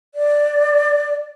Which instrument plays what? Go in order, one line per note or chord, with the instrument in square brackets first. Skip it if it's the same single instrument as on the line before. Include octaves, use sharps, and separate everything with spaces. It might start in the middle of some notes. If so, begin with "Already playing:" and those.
[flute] D5